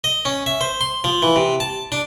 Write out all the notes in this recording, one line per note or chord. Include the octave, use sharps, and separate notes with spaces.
D#5
C#4
E5
C5
C6
F3
E3
C3
A5
D4